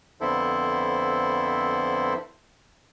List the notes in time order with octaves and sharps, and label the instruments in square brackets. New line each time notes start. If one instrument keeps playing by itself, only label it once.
[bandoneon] F2 D3 B3 E4 A4 C5